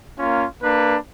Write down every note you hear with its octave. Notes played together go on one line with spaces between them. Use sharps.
A#3 C#4 F4
A#3 D4 B4